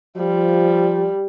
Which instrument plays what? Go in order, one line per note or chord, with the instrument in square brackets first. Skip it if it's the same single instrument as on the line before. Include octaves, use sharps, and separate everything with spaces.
[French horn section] F3 [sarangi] G3